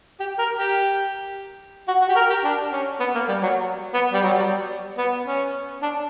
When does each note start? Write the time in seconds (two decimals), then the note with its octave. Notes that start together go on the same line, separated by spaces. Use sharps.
0.20 G4
0.38 A#4
0.56 G4
1.88 F#4
2.02 F#4
2.09 G4
2.16 A#4
2.30 G4
2.44 D4
2.72 C#4
3.00 B3
3.15 A#3
3.29 G3
3.43 F#3
3.94 B3
4.13 G3
4.23 F#3
4.33 G3
4.98 B3
5.25 C#4
5.82 D4